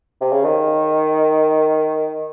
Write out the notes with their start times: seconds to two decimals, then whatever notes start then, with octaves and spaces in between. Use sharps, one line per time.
0.21 C3
0.32 C#3
0.44 D#3